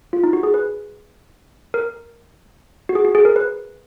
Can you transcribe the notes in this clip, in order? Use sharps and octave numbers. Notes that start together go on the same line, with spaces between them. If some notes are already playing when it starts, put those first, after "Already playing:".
F4
D#4
F#4
G#4
B4
A#4
F#4
G#4
F#4
G#4
A#4
B4